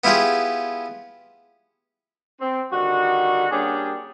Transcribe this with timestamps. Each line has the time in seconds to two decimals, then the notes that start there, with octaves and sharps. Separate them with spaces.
0.04 B3 E4 F4 G4 G#4
2.40 C4
2.72 D3 D#3 G3 F#4
3.51 G3 A#3 C#4 D4 G4 G#4